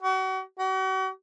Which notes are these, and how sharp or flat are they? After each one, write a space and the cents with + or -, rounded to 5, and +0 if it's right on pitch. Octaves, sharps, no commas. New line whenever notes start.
F#4 +35
F#4 +40